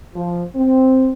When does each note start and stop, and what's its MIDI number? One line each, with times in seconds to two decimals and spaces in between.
0.15 0.43 53
0.56 1.11 60